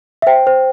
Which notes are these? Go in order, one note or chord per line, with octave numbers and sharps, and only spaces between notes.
E5
C5 G5
C5